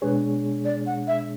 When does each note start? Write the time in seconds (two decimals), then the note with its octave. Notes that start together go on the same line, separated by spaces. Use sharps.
0.01 B2 G#3 D4 G#4 B4 C#5
0.65 D5
0.86 F#5
1.07 E5